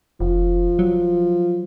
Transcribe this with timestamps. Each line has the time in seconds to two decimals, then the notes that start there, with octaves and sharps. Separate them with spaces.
0.20 F1 F3
0.79 F#3